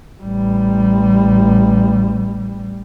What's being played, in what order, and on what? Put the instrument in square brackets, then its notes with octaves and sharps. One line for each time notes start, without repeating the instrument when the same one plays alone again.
[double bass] A1 G3